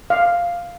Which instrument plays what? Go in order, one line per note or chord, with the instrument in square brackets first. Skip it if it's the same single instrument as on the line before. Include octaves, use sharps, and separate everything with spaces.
[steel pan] F5